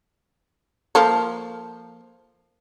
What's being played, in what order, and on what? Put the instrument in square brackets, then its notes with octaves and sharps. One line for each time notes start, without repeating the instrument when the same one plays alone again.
[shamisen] F3 A#3 A4